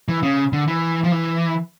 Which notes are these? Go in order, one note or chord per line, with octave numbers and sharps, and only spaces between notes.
E3
C#3
D3
E3
F3
E3